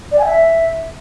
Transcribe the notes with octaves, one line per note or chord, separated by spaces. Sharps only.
D5
G#5
E5